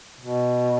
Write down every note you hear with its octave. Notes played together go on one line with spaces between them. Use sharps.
B2